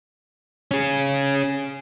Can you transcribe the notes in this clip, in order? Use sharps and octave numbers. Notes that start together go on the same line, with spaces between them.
C#4 G#4